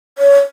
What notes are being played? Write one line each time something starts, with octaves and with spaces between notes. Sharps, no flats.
C#5